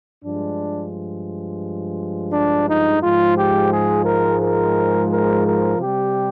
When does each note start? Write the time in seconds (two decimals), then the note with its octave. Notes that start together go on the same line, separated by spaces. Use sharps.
0.23 G2 F3 G#3 D4
2.31 D4
2.67 D#4
3.01 G#2 F3 G#3 F4
3.36 G4
3.70 G#4
4.05 A#4
4.40 A#4
5.10 A#4
5.44 A#4
5.79 C3 G3 G4